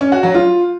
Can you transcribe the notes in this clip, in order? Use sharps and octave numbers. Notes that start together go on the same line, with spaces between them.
C#4
F#4
F#3
F4